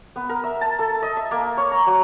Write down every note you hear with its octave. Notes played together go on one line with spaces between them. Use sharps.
B3
A#4
E5
A5
A4
D#5
E5
A#3
C#5
A#5
F#3